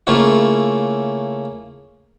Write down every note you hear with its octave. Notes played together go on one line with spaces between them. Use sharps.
C#3 A3 A#3 C#4 E4 F4